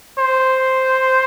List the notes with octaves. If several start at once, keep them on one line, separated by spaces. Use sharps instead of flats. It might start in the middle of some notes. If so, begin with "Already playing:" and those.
C5